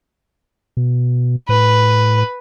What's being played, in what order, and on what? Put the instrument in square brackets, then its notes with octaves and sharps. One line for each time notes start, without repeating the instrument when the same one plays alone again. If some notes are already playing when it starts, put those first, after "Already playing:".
[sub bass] B2
[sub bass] A2 [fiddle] B4